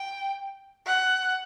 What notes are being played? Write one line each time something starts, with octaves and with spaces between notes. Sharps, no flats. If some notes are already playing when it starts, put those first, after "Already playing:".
Already playing: G5
F#5